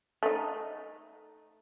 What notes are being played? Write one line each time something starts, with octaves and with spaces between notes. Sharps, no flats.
A3 D#4